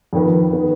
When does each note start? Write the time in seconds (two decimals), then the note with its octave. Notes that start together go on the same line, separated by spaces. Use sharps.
0.13 F2 D#3 B3
0.53 D#3 B3